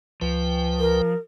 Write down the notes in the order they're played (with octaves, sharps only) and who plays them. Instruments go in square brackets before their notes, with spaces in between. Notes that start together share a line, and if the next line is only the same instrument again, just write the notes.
[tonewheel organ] C#2 B4 G5 [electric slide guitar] F3
[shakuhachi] A#4